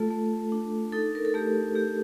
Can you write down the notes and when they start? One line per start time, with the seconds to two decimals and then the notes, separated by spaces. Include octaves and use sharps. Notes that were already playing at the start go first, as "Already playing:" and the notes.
Already playing: A3 F4 A4
0.11 A3
0.52 D4
0.92 D#4 A4
1.15 A#4
1.25 A4
1.34 A3 G4
1.75 A3 G4